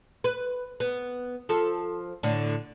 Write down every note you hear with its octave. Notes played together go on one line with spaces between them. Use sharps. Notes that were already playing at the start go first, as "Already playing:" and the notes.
B4
B3
F3 A4
A2 D3